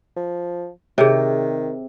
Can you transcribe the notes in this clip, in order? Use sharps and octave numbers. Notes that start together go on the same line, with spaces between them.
F3
C3 D#3 G#4 C#5